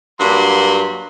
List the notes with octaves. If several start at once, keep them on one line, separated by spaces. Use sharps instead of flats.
G2 F#3 A#3 F#4 B5 C6